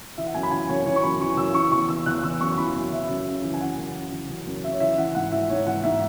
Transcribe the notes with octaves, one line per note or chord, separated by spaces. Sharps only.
E3 E5
F#5
F#2 G#5
B5
E3 G#5
F#2 C#5
E3 C#5
C#6
F#2 B5
E3 C#6
F#2 E6
E3 C#6
E2 C#6
E3 E6
E2 F#6
E3 E6
F#2 C#6
C#6
E3 B5
F#2
F#2 E5
F#2
C#3
E3
G#5
F#2 F#5
F#2
C#3
E3
F#2
F#2
C#3 E5
C#5
E3 E5
E3 F#5
G#2 F#5
E3 E5
G#2 C#5
E3 F#5
G#2 E5